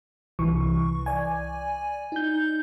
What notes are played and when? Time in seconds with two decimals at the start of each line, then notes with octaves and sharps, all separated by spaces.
0.39 C2 E3 C#6
1.06 D5 G#5
2.12 D#4 G6